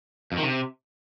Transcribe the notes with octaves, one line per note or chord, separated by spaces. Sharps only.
F2
D#3
C3